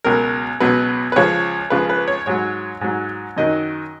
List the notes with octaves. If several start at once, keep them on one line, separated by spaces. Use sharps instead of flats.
C#2 B2 F#3 A#4
C#2 B2 F#3 B4
B4
C#2 C#3 F3 C#5
C#2 C#3 F3 B4
B4
C#5
G#2 F#3 C#5
G#2 F#3
F#2 D#3 F#3 D#5